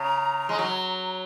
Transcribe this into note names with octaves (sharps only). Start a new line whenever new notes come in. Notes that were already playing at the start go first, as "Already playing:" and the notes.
Already playing: C#3 A#5
G#3
F#3